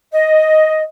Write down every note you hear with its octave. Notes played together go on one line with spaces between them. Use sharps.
D#5